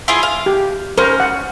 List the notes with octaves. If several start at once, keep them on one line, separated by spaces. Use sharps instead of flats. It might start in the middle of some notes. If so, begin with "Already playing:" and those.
E4 F4 G#4
F5
G4
C#4 A#4 C5
F#5